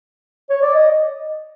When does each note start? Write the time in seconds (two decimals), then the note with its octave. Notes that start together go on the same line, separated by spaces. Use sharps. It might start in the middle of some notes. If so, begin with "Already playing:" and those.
0.50 C#5
0.62 D5
0.74 D#5